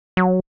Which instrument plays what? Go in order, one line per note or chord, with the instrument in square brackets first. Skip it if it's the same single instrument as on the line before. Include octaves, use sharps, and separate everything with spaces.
[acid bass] F#3